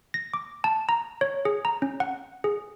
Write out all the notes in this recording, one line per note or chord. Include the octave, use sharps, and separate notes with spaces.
A#6
D6
A5
A#5
C#5
G#4
A#5
C#4
F#5
G#4